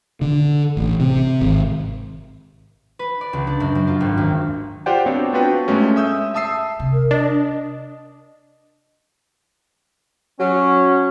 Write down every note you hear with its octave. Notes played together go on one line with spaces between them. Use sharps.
D3
A1
C3
G#1
B4
D5
C#2
D4
F#2
F#2
F4
G#1
D#2
F4 G4 C5 D5 F#5 G5
B3 C4 D4 F#4 C#5 D5
B3 D4 F4 F#4 B4 G5
G2 G#3 A3 C#4
E5 D#6 E6 G6
E5 A5 D#6 E6 C7
C3
A#4
D4 D#5
F#3 C#4